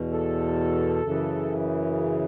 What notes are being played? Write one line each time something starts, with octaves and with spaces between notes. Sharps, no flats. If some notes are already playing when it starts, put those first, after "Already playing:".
Already playing: E2 B2
A4
F#2 C#3 E3